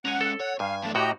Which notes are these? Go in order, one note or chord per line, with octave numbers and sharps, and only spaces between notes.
G#3 C#4 F#5 G#5 A#5
A4
C#5 F#5
G2 F5 G#5
E2 A3 D4 A5
A2 F#4 G4 D#5 G5 A#5